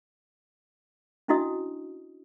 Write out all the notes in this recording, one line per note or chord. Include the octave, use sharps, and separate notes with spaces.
C#4 D4 E4 F#4 D#5 D#6